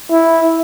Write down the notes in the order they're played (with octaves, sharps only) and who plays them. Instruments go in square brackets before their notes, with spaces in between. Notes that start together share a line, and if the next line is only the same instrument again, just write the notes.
[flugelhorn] E4